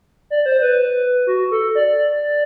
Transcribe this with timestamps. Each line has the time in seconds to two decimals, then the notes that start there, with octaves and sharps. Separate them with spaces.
0.30 D5
0.46 C5
0.62 B4
1.27 F#4
1.51 A4
1.75 D5